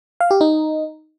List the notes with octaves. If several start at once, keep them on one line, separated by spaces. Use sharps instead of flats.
F5
G4
D#4